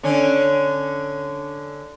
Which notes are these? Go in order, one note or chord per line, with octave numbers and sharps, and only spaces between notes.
D3 C#4